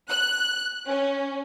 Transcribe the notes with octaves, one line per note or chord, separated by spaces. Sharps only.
F#6
C#4